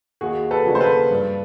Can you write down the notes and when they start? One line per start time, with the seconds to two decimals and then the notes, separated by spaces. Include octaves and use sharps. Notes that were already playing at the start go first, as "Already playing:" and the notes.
0.21 D#2 F#4 G#4
0.51 A4 B4
0.66 C#3 F#3 A#3 D4
0.75 C5
0.80 A4 B4
1.10 G2